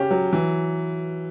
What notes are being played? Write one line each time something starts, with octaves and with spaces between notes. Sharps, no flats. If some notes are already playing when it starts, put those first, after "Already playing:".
Already playing: C#3 C#4 G4
F#3
E3